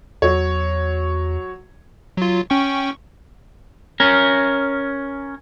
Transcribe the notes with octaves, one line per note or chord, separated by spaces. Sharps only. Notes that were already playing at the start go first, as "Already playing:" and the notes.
E2 F#3 C#5
F#3 F4
C#4 G5 C#6
C#4 A#4